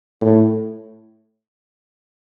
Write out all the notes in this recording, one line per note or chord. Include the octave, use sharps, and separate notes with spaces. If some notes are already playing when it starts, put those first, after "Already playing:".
A2